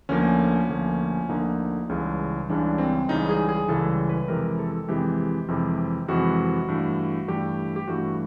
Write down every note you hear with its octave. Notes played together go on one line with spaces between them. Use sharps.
D2 D3 F3 A#3 C#4
D2 D3 F3 A#3
D2 D3 F3 A#3 D#4
C#2 C#3 E3 G3
C#2 C#3 E3 G3 D4
C4
C#2 C#3 E3 G3 D#4
G#4
G#4
C#2 C#3 E3 G3 A4
B4
F2 C3 E3 G#3 A#4
A4
F2 C3 E3 G#3 G4
F2 C3 E3 G#3
F2 C3 E3 G#3 F#4
G2 E3 A3
G2 E3 A3 G4
G4
G2 E3 A3 F#4